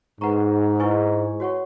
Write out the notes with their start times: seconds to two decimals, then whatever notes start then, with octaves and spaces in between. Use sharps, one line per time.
0.21 G#2 B4 F#5 A#5 C#6
0.80 E4 B4 D#5 G#5 C#6
1.40 F#4 C#5 F#5 C#6